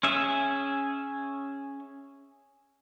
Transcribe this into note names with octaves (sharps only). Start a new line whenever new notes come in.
C#4 G#4 E5